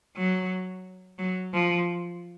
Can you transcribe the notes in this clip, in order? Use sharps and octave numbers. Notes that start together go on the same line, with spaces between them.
F#3
F#3
F3